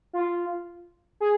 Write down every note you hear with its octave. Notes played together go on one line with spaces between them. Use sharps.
F4
G#4